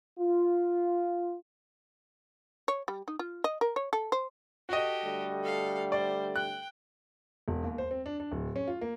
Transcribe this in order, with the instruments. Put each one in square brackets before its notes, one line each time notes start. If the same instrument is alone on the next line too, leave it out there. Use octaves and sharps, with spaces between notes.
[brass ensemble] F4
[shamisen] C#5
G3
D#4
F4
D#5
A#4
C#5
A4
C5
[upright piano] F#4 D#5 [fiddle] G4 A4
[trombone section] D3 G3 A3
[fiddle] A4 F5
[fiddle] C5 [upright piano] D5
[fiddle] G5 [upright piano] F#6
[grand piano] E1
D#2
C5
C4
D4
D4
D1
C#4
F4
A#3